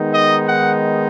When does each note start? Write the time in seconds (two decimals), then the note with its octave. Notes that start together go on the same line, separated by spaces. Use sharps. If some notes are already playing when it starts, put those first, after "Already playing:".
Already playing: D#3 G#3 B3 D#4
0.13 D#5
0.47 F#5